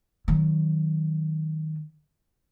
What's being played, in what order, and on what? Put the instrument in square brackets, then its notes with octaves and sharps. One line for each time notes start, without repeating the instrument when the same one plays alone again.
[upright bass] D#3 F#3